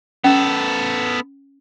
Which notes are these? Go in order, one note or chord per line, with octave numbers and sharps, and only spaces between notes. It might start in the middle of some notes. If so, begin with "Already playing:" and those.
B3 C#4 A4